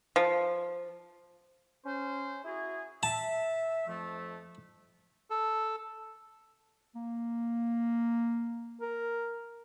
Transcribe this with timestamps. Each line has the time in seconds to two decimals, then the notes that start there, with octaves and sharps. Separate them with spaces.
0.16 F3
1.86 C#4 C5
2.45 E4 F#4 G#4
3.03 E5 A5
3.88 F2 F3 A3
5.30 A4
6.96 A#3
8.81 A#4